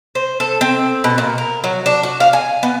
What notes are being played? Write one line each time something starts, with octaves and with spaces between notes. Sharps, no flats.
C5
A4
C4
B2
A#2
A#4
F#3
D4
F#4
F5
G#5
B3